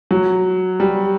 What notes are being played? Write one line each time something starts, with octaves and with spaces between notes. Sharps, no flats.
F#3
G3